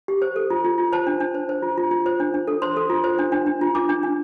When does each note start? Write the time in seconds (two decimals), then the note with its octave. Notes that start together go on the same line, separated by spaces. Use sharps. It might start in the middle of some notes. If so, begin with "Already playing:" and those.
0.08 G4
0.22 C5
0.36 A4
0.50 F4
0.65 F4
0.78 F4
0.93 C5 A5
1.07 D4
1.20 D4
1.35 C5
1.49 C5
1.62 F4
1.78 F4
1.91 F4
2.06 C5
2.20 D4
2.34 D4
2.47 A4
2.62 C5 C6
2.77 A4
2.90 F4
3.04 C5
3.19 D4
3.32 D4
3.46 D4
3.61 F4
3.75 D4 D6
3.89 D4
4.03 D4